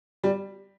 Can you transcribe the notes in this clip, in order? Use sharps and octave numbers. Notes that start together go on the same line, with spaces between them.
G3